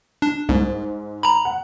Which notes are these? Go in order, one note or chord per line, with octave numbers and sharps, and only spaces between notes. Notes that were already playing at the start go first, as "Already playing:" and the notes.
D4
C2 G#2
A#5 B5
F#5